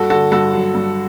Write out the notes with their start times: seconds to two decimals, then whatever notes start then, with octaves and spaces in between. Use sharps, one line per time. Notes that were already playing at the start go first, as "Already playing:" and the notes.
Already playing: G2 F#4 A4
0.10 D3 F#4 A4
0.32 G2 F#4 A4
0.53 F#3
0.75 G2